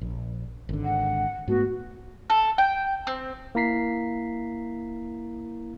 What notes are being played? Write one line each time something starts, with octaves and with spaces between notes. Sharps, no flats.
A#1
G#1 D3
F#5
G#2 A3 B3 F#4
A4
G5
C4
A#3 E4 A#5 B6 C7